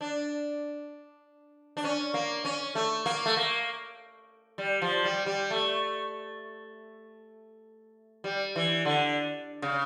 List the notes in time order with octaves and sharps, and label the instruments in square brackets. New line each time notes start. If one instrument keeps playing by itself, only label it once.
[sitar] D4
D4
C#4
A#3
C#4
A3
A#3
A3
A#3
G3
F3
G3
G3
A3
G3
E3
D3
C#3